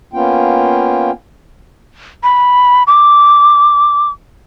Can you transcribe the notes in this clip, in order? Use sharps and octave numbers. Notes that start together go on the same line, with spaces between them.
A#3 B3 C#4 F4 G5
B5
D6